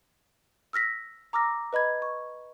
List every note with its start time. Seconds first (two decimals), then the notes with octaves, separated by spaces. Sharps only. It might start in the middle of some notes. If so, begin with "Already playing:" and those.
0.73 E6 F6 A#6 B6
1.33 A#5 D6 E6 F6 A#6
1.73 B4 D#5 B5 G#6
2.02 C#6